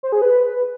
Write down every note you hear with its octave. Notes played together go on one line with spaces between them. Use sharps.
C5
G#4
B4